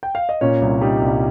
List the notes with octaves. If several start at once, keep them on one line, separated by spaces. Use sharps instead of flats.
G5
F5
D#5
A#2 C#4 C#5
C2
G3 D#4 D#5
C2